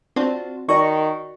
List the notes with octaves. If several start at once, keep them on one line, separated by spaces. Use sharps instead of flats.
C4 D4 F4 F#4
D#3 F#4 D5 D#5 C#6